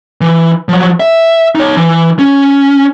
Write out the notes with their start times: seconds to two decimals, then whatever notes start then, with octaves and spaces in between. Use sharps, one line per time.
0.21 E3
0.69 F3 F#3
1.00 E5
1.55 D#4 C#5
1.77 E3
2.19 C#4